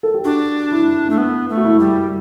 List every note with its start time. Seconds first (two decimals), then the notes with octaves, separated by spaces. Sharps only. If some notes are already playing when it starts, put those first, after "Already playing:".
0.03 A4
0.14 G4
0.24 D4 F#4
0.72 E4
1.10 A3
1.18 B3
1.49 A3
1.57 F#4
1.65 E4
1.79 G3